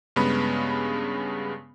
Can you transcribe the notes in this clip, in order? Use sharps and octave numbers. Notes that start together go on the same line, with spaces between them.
G2 C#3 G#3 B3 B5